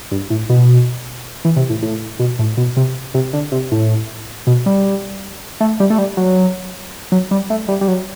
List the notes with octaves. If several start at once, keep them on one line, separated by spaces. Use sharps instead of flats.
G2
A2
B2
E3
C3
A2
A2
B2
A2
B2
C3
C3
D3
C3
A2
B2
G3
A3
G3
A3
G3
F#3
F#3
G3
A3
G3
G3
F#3